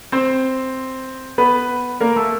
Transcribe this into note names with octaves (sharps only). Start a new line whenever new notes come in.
C4 C5
B3 B4
A#3 A#4
A3 A4